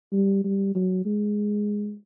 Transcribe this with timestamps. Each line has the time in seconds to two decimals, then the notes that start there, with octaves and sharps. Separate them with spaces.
0.12 G3
0.44 G3
0.75 F#3
1.05 G#3